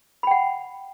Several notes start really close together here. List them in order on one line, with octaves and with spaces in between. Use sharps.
B5 G5 F#5